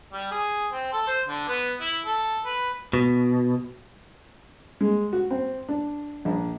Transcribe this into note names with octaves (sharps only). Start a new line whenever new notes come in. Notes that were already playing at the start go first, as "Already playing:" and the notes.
G3
G#4
C4
A4
C5
D3
B3
E4
A4
B4
B2
G#3
F#4
C4
D4
A#1